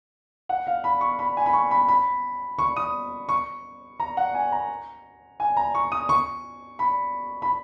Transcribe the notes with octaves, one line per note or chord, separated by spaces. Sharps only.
F#5
F5
B5
C#6
B5
G#5
B5
C#6
B5
B5
C#6
D#6
C#6
A#5
F#5
G#5
A#5
G#5
A#5
C#6
D#6
C#6
B5
B5